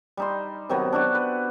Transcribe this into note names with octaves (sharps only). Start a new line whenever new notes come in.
G3 D#4 C6
C3 D#3 F#3 B3
D4 E4 F#4 G4
B4